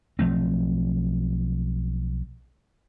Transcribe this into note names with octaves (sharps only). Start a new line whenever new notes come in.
B1 F3 A3 C4